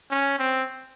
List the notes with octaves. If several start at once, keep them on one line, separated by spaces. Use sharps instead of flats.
C#4
C4